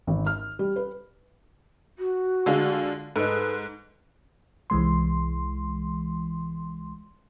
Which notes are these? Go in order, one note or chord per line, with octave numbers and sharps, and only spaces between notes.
G#1
F6
G3
B4
F#4
D3 G#3 F4
G#2 G#4 A4 B4 D#5
C2 E3 G#3 C6